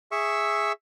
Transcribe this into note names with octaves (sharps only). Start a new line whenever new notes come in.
G#4 E5 C#6 E6